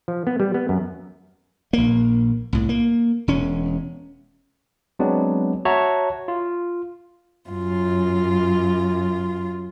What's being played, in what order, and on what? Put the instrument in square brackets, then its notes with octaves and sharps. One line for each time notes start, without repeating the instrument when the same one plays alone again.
[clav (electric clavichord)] F3
B3
G3
B3
F#2
[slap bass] A#1 A#3
C2 A2
A#3
E1 C#4
[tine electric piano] F#3 G#3 B3 C4 D4
F#4 C#5 E5 A5 A#5
F4
[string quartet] F#2 F4